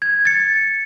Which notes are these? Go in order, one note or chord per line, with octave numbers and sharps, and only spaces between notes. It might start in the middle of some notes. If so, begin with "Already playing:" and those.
G#6
A6 C#7